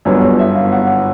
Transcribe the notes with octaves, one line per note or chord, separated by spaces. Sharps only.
G1 F#2 D3 G3 B3 C#5
D5
E5
F5
F#5